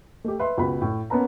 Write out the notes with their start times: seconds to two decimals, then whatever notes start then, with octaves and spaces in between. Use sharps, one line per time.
0.24 A3 G4
0.40 B4 E5 C6
0.58 C#2 B2 F#4 B4 B5
0.82 A2
1.10 A#3 B3 C#4 B4 A5 A#5